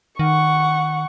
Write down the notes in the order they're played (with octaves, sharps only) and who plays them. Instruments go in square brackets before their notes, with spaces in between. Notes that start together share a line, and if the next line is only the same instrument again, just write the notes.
[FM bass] D#3 [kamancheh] F#5 C#6